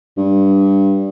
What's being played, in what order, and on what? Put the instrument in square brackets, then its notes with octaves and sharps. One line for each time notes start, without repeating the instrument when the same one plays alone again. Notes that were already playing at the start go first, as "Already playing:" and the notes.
[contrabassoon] G2